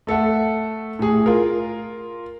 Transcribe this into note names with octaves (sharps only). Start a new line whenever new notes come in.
A3 A4 E5 F#5
A2 G#4
F4 A#4